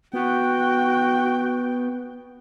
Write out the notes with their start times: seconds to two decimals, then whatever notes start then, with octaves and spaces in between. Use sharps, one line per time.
0.14 B3 F#4 G5